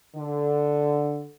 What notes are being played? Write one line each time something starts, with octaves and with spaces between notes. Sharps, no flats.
D3